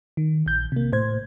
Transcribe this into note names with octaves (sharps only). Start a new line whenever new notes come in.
D#3
A#1 G6
C3 A#3
A2 C5 G#6